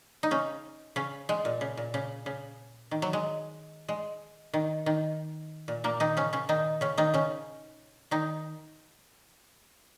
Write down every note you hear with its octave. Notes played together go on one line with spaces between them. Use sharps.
D#4
C#3 C#4
C#3 C#4
G#3
A#2
C#3
A#2
C#3
C#3
D#3
F#3
G#3
G#3
D#3
D#3
A#2
A#2 A#3
D#3 D#4
C#3 C#4
C#3 C#4
D#3 D#4
C#3 C#4
D#3 D#4
C#3 C#4
D#3 D#4